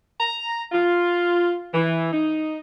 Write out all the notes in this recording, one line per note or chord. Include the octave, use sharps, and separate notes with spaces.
A#5
F4
E3
D#4